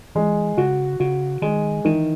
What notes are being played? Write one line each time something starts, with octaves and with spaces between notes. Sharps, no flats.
E3 G#3
C#3 F#4
C#3 F#4
D#3 G#3
D#3 E3